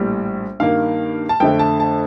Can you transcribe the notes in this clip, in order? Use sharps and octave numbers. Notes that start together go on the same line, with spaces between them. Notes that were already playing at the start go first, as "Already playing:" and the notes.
Already playing: A#1 A2 G3
G2 D#3 A#3 F5
A5
F2 D3 A3 G5
A5
A5